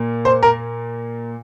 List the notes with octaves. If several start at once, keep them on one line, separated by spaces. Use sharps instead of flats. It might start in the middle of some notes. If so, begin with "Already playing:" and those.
Already playing: A#2 A#3
C5
A#4